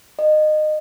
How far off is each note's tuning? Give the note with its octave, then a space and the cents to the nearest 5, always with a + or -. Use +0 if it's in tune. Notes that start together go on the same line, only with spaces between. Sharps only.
D#5 -25